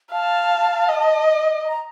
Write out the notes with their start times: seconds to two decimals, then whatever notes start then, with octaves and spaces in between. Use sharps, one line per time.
0.12 F5 A5
0.89 D#5
1.65 A#5